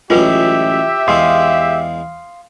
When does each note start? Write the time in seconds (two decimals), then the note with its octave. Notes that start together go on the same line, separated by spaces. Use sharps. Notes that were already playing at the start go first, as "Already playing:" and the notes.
0.10 A1 F#3 G#3 F4 G4 B4 E5
1.08 E2 G#3 F5 C6 D#6